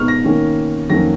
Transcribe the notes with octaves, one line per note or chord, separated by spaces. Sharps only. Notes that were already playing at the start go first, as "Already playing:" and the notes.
Already playing: B2 G#3 B3 D#4 C#6 F6
A#6
D#3 A#3 C#4
F2 D#3 F#3 A#3 C#4 A#6